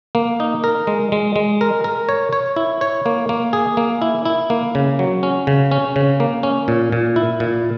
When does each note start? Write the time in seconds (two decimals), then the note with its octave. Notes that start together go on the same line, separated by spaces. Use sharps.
0.15 A#3
0.40 D#4
0.64 A#4
0.87 G#3
1.12 G#3
1.36 G#3
1.61 A#4
1.84 A#4
2.09 C#5
2.33 C#5
2.56 E4
2.81 C#5
3.06 A#3
3.29 A#3
3.53 G#4
3.77 A#3
4.02 E4
4.25 E4
4.50 A#3
4.75 C#3
4.99 F#3
5.23 C#4
5.47 C#3
5.71 C#4
5.96 C#3
6.20 A#3
6.43 C#4
6.68 A#2
6.92 A#2
7.16 E4
7.40 A#2